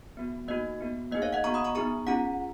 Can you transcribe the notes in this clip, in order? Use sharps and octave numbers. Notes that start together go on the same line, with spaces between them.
B3 F#4
A#3 D#4 F#4 D#5
B3 F#4
A#3 D#4 G#4 D#5
C#5 F5
D#5 F#5
B3 F#4 A#5 C#6
B5 D#6
A#5 C#6
B3 D#4 G#4 A#5 C#6
C#4 F4 G#4 F#5 A#5